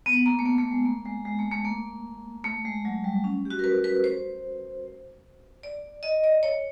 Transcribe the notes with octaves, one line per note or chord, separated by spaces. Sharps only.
B3
A#3
A3
A#3
A3
G#3
A#3
G#3
G#3
A3
A3
A#3
A3
G#3
F#3
G3
C#4
G4
F#4
A#4
B4
B4
C5
D5
D#5
D5
C#5